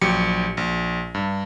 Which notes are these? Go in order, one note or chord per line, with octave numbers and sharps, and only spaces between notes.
A#1 F#3 G4 C#7
A#1
G2